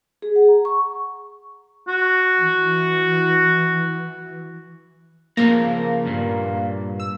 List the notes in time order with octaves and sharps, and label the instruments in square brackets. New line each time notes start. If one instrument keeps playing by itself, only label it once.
[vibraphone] G#4
F#5
A#5
C#6
[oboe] F#4
[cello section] E3
[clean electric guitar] C#3 F3 A#5 [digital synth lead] A#3
[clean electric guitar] G2 A#2
[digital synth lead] E6